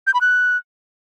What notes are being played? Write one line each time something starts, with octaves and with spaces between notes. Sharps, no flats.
G6
B5
F#6